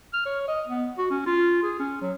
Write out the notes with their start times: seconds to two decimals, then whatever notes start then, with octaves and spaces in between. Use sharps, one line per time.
0.13 F6
0.26 C#5
0.48 D#5
0.67 B3
0.98 F#4
1.10 C#4
1.26 F4
1.63 G#4
1.79 C#4
2.01 F#3